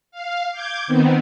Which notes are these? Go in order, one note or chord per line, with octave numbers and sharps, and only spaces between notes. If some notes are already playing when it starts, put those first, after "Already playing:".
F5
D6 G6 G#6
D#3 B3 C4